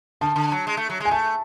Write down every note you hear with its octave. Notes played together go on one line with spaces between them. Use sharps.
D3 A5
D3
F#3
G#3
A3
F#3
G#3
G#5
A3 A5